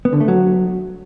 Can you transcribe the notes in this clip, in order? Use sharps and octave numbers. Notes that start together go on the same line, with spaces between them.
B3
D3
A3
F#3